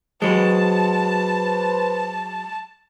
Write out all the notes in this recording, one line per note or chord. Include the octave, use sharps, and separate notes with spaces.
F#3 G#3 B4 C5 A5